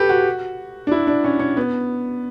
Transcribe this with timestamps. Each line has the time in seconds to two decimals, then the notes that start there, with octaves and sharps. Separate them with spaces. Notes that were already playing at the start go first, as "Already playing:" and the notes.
Already playing: G4 A4 B4
0.09 F#4
0.87 D4
0.92 E4
1.07 D4
1.24 C#4
1.40 C#4
1.57 B3